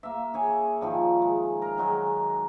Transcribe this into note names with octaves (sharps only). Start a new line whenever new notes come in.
A#3 E5
G#4 C#5 G#5
D#3 F3 G3
G#3
A#4
D#3 F#3 G#3